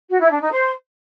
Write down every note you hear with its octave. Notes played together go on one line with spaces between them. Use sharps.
F#4
E4
D4
D#4
C5